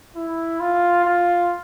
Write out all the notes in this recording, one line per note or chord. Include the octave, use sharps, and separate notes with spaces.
E4
F4
F4